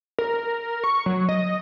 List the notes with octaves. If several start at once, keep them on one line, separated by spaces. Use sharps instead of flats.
A#4
C#6
F#3
D#5